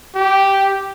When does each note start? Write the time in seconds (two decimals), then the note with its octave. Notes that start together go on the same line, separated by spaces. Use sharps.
0.15 G4